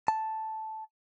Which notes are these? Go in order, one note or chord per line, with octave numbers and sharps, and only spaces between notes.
A5